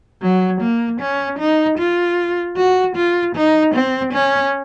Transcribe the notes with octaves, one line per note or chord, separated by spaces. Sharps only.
F#3
A#3
C#4
D#4
F4
F#4
F4
D#4
C4
C#4